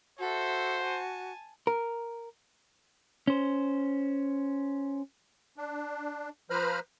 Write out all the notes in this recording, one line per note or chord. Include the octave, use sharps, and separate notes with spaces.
F#4 A4 C5 E5
G#5 A5
A#4
C#4 C5
D4
F3 B4 C5 A#5 B5 F6